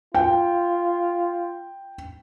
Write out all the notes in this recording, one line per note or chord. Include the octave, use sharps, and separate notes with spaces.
F4 G5